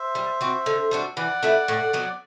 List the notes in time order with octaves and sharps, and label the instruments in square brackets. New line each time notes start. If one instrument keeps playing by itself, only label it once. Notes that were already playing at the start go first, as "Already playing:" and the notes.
Already playing: [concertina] C5 E5
[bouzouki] G3
C4 F#4
D3
G3 D4 F#4
[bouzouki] E3 [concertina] D5 F#5
[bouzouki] A3 E4 B4
A2
F#3 B3